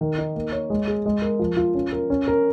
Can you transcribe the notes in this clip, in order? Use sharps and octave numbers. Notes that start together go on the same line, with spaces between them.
D#3
D#4
A#3
C#5
G#3
G#4
G#3
A#4
F3
F4
C#4
A#4
C#4
A#4